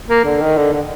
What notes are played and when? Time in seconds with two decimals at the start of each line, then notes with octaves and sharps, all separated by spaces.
0.08 A#3
0.25 D3
0.41 D#3
0.57 D3
0.73 D3